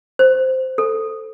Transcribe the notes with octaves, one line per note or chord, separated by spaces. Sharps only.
C5
A4